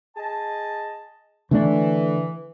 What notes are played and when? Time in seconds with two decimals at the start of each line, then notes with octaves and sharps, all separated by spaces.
0.17 G#4 D#5 A5
1.51 D3 E3 A3 D4